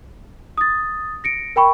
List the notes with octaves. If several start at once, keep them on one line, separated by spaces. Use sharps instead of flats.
D#6 A6
A#6 C#7 D7
A#4 G5 B5 C#6